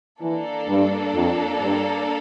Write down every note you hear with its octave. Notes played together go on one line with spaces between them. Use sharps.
E3 A#3 D4 A4
G2
F2
G2